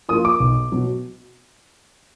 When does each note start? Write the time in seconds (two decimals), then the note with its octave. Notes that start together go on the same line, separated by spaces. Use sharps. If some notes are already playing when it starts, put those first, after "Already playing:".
0.09 F3 A#3 F4 D#6
0.25 D6
0.40 B1
0.72 B2 F#3